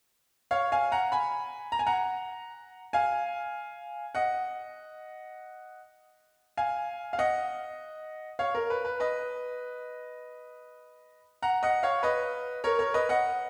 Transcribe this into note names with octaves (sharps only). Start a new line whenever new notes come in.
C#5 F5
F5 G#5
F#5 A#5
G#5 B5
A#5
G#5
F#5 A#5
F5 G#5
D#5 F#5
F5 G#5
F5
D#5 F#5
C#5 F5
A#4
B4
B4
B4 D#5
F#5 A#5
D#5 F#5
C#5 F5
B4 D#5
A#4 C#5
A#4 C#5
B4 D#5
D#5 F#5